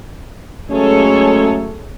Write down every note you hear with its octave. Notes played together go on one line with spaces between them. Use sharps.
F#3 G#3 A3 C#4 G#4 A4 C#5